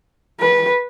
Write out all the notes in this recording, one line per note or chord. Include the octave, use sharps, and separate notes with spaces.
B4